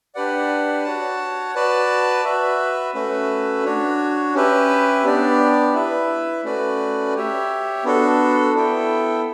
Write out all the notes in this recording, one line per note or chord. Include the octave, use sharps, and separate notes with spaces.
D4 G4 B4 D5 F#5
F#4 C#5 F#5 A5
F#4 B4 D5 A5
F#4 B4 E5
A3 C#4 F#4 B4 E5
D4 F#4 C#5
C#4 G4 B4 E5
B3 D4 G4 D5
E4 B4 E5
A3 C#4 F#4 B4 D5
G4 C#5 E5
B3 D4 F#4 A4
B3 E4 A4 E5 G5